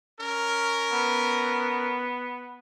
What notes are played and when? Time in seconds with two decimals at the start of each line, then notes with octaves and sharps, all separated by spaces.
0.19 C#4 A#4
0.92 B3